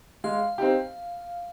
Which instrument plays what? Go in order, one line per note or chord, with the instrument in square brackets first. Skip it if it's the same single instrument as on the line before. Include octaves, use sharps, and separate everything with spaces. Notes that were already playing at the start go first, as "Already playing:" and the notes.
[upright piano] G#3 [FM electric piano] F5
[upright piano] C4 D#4 G4